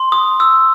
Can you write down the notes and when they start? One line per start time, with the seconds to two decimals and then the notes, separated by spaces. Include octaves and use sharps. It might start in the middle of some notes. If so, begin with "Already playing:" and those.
Already playing: C6
0.12 D#6
0.40 E6